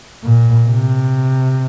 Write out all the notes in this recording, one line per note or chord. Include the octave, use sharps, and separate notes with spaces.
A#2
C3